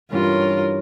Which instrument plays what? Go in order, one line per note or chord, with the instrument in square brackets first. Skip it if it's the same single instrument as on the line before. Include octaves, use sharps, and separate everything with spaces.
[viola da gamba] G2 F4 A#4 [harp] E3 G3 C#4